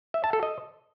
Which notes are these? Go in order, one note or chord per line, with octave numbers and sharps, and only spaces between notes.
E5
A5
A4
D#5